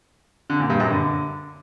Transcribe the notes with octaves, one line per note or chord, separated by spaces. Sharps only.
D3
A#2
G2
F#2
D3